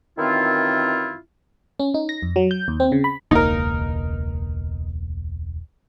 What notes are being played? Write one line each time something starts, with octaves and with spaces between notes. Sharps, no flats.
F#2 D#3 E3 C4 E4 F4
C#4
D#4
A#6
F2
F#3
G6
D#2
C4
C#3
B5
E1 C#2 A#3 D#4 A#4